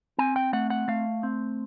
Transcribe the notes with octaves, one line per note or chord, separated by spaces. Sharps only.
C4 G#5
G5
A3 F#5
F#5
A3 F5
C4